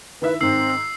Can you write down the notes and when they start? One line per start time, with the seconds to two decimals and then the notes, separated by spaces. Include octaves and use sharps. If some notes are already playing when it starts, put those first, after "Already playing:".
0.22 D#3 E4 B4 E5
0.41 G#2 D#3 C4 E6 C7
0.70 E6